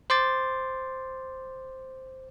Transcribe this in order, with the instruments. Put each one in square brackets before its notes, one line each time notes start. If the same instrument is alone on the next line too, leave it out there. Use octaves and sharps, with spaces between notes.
[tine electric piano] C5 C6 D6 A6